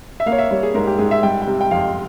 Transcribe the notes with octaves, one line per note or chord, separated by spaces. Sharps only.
E5
A#3 F5
C#5
E5
G3 C#5
G#4
G#2 A#4
G4
G#2 G#4
E5
G3 G5
G5
C3
G5
F2 F5